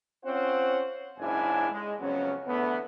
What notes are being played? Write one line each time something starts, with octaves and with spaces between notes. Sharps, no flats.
C4 C#4 F4 C5 C#5 F#5
F#1 G#2 C#4 D4 E4 G#5
G#3
F2 C#3 F#3 B3 C#4
E2 D3 A3 B3